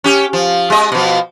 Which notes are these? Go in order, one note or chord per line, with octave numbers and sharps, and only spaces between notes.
C#4 G4
F3
G#3 D#5
B2 F3